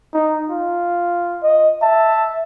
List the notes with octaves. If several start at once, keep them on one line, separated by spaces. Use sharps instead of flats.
D#4
F4
D#5
E5 A5